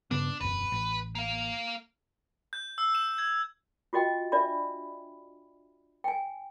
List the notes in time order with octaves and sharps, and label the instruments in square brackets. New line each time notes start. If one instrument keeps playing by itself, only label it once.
[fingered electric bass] G2 C#3 B3 [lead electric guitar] D4
[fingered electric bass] E1 F#2 [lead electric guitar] B4
[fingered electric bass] A1
[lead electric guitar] A#3 F5
[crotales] G6
E6
E7
G#6
[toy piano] F4 F#4 D#5 G5
D4 D5 E5 B5
G5 G#5